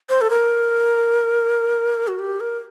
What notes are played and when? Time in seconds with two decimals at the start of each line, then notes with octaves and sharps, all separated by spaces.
0.09 C5
0.21 A4
0.30 A#4
2.08 F#4
2.19 G4
2.40 A#4